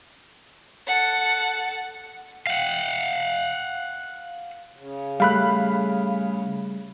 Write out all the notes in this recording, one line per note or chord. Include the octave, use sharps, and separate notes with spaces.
A4 F#5
F5 F#5
C#3
G3 A3 F5 B5 F#6